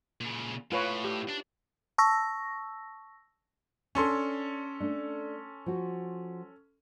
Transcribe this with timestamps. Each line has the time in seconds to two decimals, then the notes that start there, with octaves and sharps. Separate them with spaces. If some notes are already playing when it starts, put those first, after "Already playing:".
0.21 A#2 C#3
0.72 A2 F4 B4 C#5
1.04 G4
1.29 D4
1.98 A5 C#6 E6 A#6
3.95 C#4 D4 A4 C6
4.80 A3 D4
5.66 F3 F#4